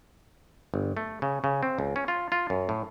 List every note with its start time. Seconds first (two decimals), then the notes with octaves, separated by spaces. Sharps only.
0.74 G1
0.97 A3
1.22 C#3
1.44 C#3
1.63 C4
1.79 C#2
1.96 C#4
2.08 F4
2.32 F4
2.50 F#2
2.69 A2